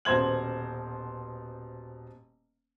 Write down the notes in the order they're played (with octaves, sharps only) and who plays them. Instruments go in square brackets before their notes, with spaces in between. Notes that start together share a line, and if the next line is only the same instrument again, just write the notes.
[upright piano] D#1 B2 C5 G#6 F#7